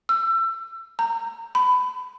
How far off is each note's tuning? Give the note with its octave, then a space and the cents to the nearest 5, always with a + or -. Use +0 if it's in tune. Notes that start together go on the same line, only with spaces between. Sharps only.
E6 +30
A#5 -20
B5 +20